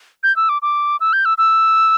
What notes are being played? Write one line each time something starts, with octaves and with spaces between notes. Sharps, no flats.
G6
E6
D6
D6
E6
G6
E6
E6